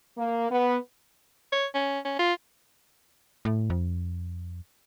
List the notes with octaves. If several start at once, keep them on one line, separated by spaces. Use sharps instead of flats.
A#3
B3
C#5
C#4
C#4
F4
A2
F2